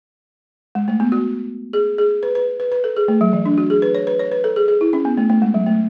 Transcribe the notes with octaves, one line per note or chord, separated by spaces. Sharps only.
G#3
A3
B3
F#4
G#4
G#4
B4
B4
B4
B4
A4
G#4
A3
F#3
E3
D4
F#4
G#4
B4
C#5
B4
C#5
B4
A4
G#4
G#4
E4
C#4
B3
A3
A3
G#3
F#3
A3